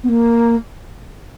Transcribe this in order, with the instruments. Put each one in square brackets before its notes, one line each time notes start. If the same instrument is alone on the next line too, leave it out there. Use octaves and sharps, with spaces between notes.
[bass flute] B3
A#3